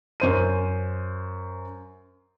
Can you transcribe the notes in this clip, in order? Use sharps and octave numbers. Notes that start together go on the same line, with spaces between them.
F#2 C5 D#7